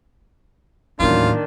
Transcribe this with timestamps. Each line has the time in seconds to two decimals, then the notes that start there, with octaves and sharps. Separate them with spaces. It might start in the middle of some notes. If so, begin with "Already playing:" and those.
1.00 D#2 A2 D#3 E3 F#3 C#4 D4 F4